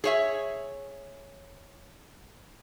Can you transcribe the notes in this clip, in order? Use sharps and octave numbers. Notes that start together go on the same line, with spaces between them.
G#4 C#5 E5